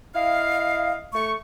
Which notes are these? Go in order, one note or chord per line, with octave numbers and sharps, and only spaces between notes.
E4 D#5 F5
A3 C#6